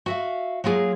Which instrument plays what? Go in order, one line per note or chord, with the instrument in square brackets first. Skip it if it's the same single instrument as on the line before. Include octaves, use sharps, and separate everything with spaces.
[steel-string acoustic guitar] F#4 E5 F5
F#3 A#3 F4 G#4